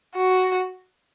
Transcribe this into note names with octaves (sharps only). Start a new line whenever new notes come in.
F#4